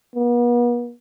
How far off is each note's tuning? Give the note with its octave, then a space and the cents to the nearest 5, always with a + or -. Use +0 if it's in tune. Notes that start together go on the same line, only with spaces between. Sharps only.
B3 -40